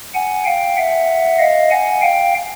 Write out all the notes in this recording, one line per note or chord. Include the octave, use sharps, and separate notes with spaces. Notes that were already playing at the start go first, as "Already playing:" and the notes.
F#5 G#5
F5 G5
E5 F#5
D#5 F5
F#5 G#5
F5 G5